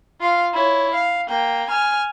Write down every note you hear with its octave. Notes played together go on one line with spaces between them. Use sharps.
F4 F5
E4 C#5
F5
A#3 G5
G#5 F6